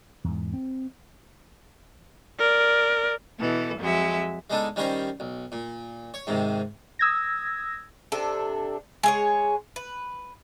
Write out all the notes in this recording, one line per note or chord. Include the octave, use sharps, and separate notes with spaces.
E2 G#2
C4
A#4 D5
B2 E3 A4
F2 F#3 G#3 E5
G#3 B3 D4 D#4 A4
D#3 G3 C#4 A#4 C5
B1
A#2
C#5
G#2 C3 D#3
D#6 E6 G#6 A#6
C3 D4 A4
G#3 G#4 C#5
B4